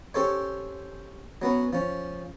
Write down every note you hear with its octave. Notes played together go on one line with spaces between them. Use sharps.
C#4 G4 A4 C5 C#5
F#3 B3 C#4
F3 C#4